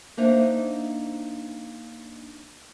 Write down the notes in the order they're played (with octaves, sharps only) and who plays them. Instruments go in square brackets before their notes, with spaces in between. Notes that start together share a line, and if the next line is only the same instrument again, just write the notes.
[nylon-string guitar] A#3 D4 D#4 C5 E5 F5